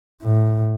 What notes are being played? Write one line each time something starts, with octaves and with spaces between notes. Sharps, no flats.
A2